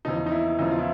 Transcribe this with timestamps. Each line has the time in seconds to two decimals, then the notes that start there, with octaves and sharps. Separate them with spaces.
0.05 E2 C#3 F3 D#4
0.26 D#4
0.32 E4
0.59 E2 C#3 F3 D#4
0.71 F4
0.79 E4